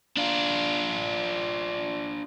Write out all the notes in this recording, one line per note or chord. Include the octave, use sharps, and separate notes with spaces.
D4 F4